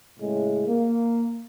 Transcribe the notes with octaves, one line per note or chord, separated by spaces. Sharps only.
A2 C#3 G#3
A#3